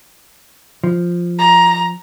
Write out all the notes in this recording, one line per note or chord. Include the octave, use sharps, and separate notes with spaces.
F3
A#5